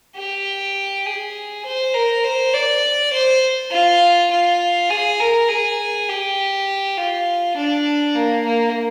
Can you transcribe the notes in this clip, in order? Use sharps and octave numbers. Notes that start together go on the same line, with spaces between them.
G4
G#4
C5
A#4
C5
D5
C5
F4
F4
G#4
A#4
G#4
G4
F4
D4
A#3
A#3